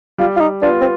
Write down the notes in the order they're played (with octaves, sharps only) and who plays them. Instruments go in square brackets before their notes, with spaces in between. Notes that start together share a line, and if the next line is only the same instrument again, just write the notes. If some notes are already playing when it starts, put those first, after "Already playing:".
[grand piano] G3 [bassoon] F4
[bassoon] F4
D#4
[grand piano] B3 F4 [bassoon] D4
[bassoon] C4